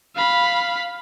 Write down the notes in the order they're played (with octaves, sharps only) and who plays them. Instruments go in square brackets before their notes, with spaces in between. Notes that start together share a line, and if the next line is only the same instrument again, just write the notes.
[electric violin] F5 B5